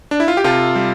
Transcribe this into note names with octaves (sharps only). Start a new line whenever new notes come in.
D4
E4
F4
G4
C3 F4 A4
G3